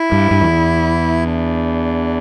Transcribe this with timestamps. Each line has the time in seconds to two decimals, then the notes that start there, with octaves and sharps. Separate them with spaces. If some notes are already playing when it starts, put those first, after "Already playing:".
Already playing: E4
0.12 G2
0.31 G2
0.41 E2
1.26 D4